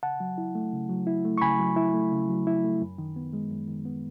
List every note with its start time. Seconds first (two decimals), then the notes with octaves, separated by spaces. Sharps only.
0.03 C#3 F#5 A5
0.20 F#3
0.38 E4
0.55 A3
0.73 C#3
0.89 F#3
1.07 E4
1.25 A3
1.38 C#6
1.41 C#3 G#5 B5
1.59 F#3
1.76 E4
1.94 A3
2.12 C#3
2.28 F#3
2.47 E4
2.64 A3
2.82 F#2
2.98 D#3
3.16 B3
3.33 G#3
3.51 F#2
3.68 D#3
3.85 B3